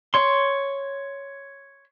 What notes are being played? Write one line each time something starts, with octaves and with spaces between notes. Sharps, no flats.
C#5 C6